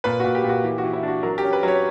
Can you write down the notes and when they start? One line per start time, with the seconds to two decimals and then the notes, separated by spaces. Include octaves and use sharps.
0.04 A#2 B4
0.20 A#2 F#4
0.35 G4
0.44 A#2
0.49 F#4
0.64 E3 G4
0.78 F#4
0.84 E3
0.93 E4
1.03 D4
1.08 F#4
1.23 F#3 A#4
1.38 G4
1.43 C#4
1.53 B4
1.63 F#3
1.68 C#5